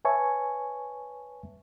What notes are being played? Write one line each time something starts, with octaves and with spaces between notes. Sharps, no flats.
B4 C#5 E5 G#5 A5 C#6